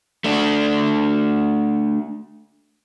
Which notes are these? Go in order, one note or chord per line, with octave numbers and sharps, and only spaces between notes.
A3 D4